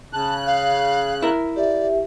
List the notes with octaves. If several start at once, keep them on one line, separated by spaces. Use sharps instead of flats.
C#3 A5 F#6
F5
E4 A#4
G4 D5 E5